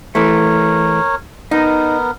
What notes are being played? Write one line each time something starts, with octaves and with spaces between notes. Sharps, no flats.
E3 A3 A#4 C#5
B3 D#4 A#4